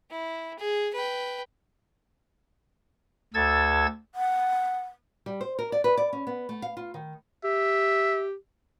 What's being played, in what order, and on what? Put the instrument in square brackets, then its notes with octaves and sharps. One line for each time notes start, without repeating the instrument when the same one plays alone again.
[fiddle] E4
G#4
B4 G5
[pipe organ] D2 A4 E6 G#6 A6
[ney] F#5
[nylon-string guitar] G3
C5
A#4
D5
B4
D5
C#4
B3
A3
F5
F4
D#3
[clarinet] G4 [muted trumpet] E5